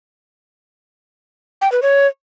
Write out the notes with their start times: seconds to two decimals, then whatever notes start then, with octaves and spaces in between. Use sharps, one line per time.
1.62 G5
1.72 B4
1.82 C#5